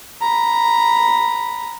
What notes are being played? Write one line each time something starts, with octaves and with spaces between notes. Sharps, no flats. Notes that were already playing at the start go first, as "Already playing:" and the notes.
A#5 B5